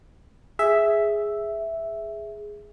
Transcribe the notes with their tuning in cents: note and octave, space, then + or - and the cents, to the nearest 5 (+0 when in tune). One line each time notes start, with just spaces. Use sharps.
G#4 +0 E5 +0